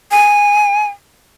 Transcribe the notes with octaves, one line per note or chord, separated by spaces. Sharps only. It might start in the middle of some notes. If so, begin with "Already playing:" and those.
G#5